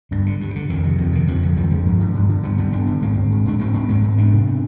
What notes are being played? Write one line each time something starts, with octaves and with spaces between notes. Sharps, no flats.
G2 D3
D3
G2
D3
F2 D#3
C3
F2 D3
C3 D#3
F2 D3 F3
D3
F2 D#3 G3
D3 F3 G#3
G2
D3
G2
D3
G2 G3 B3
D3 G3 B3
G2 B3 D4
D3
G#2 G#3 C4
G#2
G#2
G#2 D4
G#2 G#3 C4
G#2 B3 D4
G#2 G#3 C4
G#2
F2 B3 D4
C3